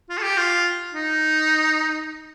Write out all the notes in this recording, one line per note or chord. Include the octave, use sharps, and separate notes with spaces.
F4
A4
G4
F4
D#4